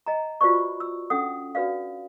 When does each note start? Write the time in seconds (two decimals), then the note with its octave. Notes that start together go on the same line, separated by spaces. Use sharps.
0.06 D#5 G#5 A#5
0.41 F4 F#4 B4 C5 D5 C#6
0.80 E6
1.10 C#4 D4 A4 F#5 D#6
1.55 D4 F#4 B4 D5 F5